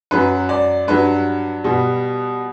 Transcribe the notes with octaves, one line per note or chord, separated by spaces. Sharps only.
F#2 F#3 B4
D5
G2 F#3 B4
B2 G3